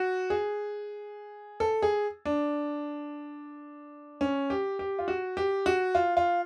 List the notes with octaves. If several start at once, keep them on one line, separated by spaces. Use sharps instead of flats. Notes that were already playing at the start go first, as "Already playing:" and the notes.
Already playing: F#4
G#4
A4
G#4
D4
C#4
G4
G4
F4
F#4
G4
F#4
F4
F4